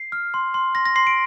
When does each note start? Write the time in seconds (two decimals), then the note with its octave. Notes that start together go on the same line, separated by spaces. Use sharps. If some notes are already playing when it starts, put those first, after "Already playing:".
Already playing: C7
0.12 F6
0.34 C6
0.54 C6
0.75 C6 A#6
0.85 A#6
0.96 C6 C7
1.07 D7